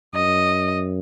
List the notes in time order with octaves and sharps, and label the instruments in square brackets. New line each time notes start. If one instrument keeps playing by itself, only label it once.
[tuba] F#2 [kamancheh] D#5